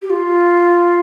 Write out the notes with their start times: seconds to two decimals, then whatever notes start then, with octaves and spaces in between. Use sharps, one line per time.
0.02 G4
0.09 F4